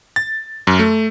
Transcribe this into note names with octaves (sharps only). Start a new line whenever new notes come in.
A6
F#2
A3